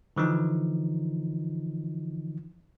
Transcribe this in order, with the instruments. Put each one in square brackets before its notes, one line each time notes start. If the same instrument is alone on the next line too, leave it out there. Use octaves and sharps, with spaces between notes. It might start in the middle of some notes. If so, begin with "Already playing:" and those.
[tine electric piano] D3 E3 F3 D#4